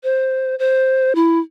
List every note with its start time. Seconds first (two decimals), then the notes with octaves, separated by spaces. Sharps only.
0.03 C5
0.59 C5
1.15 E4